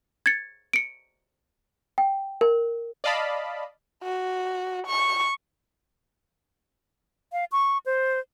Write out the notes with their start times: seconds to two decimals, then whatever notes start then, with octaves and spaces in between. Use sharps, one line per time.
0.26 G#6 A6 C#7
0.73 C#7 D7
1.98 G5
2.41 A#4
3.04 D5 D#5 F5 A5 B5
4.03 F#4
4.87 C#6
7.33 F5
7.52 C#6
7.86 C5